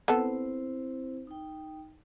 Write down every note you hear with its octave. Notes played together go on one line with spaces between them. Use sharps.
B3 C4 E4 A4 C5
D#4 G5